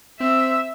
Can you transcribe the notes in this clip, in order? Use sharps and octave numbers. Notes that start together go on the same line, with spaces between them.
C4 E5